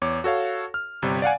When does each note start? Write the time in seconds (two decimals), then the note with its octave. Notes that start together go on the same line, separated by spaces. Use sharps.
0.02 E2 C#5 D6
0.24 F#4 A4 C#5 F5
0.74 F6
1.02 G1 C3 G3
1.22 D5 F5 F#5 G#5